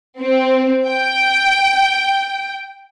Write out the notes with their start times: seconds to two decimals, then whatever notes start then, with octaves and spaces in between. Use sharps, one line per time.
0.21 C4
0.88 G5